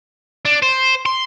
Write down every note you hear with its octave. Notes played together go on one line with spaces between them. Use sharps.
D4
C5
C6